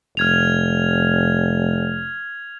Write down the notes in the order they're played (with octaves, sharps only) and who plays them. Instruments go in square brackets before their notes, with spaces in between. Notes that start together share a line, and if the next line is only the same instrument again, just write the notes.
[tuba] F1 [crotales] F6 G#6 F7